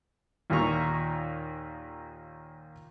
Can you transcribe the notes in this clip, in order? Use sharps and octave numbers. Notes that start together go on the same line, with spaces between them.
D#2 A#2 D#3 A#3 A#5 C#6